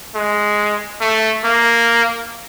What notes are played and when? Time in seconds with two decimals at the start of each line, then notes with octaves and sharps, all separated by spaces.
0.15 G#3
1.01 A3
1.44 A#3